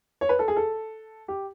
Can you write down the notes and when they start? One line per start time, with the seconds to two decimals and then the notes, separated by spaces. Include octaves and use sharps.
0.21 C#5
0.29 B4
0.39 A4
0.48 G#4
0.56 A4
1.28 G4